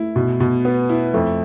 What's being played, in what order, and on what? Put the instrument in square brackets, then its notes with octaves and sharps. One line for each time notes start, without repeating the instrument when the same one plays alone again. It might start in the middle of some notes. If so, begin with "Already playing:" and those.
Already playing: [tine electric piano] A3 [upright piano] E4
[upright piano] B2
B2
B3
E4
[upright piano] F2 [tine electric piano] A3